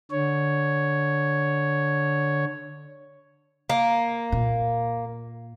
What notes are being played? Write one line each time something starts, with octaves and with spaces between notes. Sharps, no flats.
D3 C#5
A#3
A#2